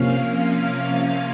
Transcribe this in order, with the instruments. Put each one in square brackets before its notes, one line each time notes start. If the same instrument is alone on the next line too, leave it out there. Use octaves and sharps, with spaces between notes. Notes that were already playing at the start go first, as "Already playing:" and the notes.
Already playing: [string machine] C3 F3 A#3 C#4 F5